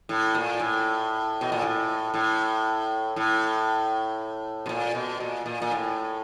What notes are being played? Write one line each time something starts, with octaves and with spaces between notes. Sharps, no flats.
A2
A#2
A2
B2
A#2
A2
A2
A2
B2
A#2
B2
A#2
A#2
A#2
A2